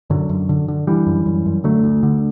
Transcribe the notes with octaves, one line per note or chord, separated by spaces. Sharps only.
F#2 D3 F#3
F#2
D3
D3
D3 E3 G3
F#2
F#2
F#2
D3 F#3 A3
D2
D3